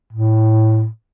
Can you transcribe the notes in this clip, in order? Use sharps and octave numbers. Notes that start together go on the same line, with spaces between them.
A2